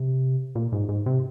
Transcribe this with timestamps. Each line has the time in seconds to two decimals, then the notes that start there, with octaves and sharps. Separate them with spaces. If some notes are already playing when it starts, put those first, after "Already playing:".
Already playing: C3
0.55 A#2
0.72 G#2
0.89 G#2
1.06 C3